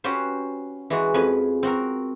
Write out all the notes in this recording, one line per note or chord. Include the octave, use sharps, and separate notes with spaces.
C#4 F#4 G4 B4 C5
E3 G#3 F#4
F2 F3 B4 G#5
C4 F#4 A#4